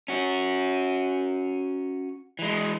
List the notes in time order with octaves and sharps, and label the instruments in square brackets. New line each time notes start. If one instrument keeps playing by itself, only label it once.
[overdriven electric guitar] C#4 F#4
E3 G#3